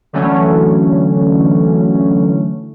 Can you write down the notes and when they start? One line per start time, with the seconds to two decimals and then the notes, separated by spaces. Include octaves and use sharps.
0.13 D3 E3 F#3 A3 C#4